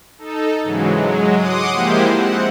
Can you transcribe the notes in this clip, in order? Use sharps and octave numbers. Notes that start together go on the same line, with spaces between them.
D#4 A4
G#2 C#3 E3 F#3 G#3
F#3 G#3
F#5 C6 D6 D#6
F3 G#3 A#3 E4 G4 C5
C4 F#5